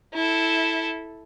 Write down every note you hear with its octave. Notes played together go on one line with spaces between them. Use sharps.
E4 A4